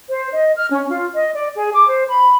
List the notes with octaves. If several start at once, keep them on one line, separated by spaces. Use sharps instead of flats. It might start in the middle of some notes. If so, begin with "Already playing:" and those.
C5
D#5
F6
C#4
F4
D#5
D5
G#4
D6
C5
B5